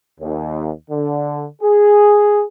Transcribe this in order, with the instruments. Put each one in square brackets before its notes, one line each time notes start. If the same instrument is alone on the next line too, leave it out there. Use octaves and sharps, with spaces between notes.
[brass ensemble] D#2
D3
G#4